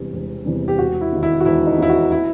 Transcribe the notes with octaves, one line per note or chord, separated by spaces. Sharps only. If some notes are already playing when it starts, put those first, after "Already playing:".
Already playing: E1 E2 C3 E3 G3
E1
E2 C3 E3 G3
G4
E1 F#4
E4
D#2 D#3
E4
F#4
E1 E4
D#4
D#2 D#3 E4
F#4
E4